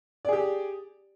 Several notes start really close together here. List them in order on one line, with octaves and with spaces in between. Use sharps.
D5 G#4 G4